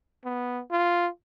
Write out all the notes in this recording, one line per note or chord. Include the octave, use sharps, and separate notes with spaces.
B3
F4